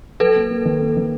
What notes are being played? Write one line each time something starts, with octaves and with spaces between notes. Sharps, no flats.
F#3 A4 B4
A#3
A#3
D#3
A#3
D#3